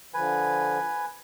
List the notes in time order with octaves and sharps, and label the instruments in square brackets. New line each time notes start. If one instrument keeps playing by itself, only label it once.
[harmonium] D3 F3 [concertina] B4 G#5